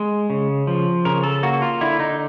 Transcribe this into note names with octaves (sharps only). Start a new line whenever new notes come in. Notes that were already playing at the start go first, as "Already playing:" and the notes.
Already playing: G#3
C#3
F3
C#3 A#4
A4
A#3 F#4
F4
D3 E4
D#4